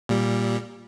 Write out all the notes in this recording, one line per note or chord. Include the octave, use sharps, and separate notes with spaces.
A#2 G3